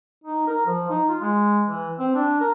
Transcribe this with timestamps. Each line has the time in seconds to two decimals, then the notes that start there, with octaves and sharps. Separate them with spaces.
0.24 D#4
0.47 A#4
0.66 F3
0.89 D#4
1.09 F4
1.21 G#3
1.66 E3
1.99 C4
2.15 D4
2.41 A#4